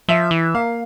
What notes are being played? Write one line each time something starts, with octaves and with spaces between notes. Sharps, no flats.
F3 E5
E3
A#3 F5